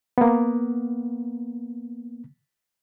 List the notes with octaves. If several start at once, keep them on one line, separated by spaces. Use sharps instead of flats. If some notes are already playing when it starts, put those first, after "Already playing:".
A#3 B3